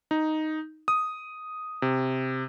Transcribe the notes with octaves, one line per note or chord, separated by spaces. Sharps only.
D#4
D#6
C3